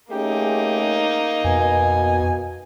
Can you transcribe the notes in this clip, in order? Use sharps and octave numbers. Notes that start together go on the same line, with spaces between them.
A3 A#3 C#4 D#4 G4 G#4
F2 B2 G#5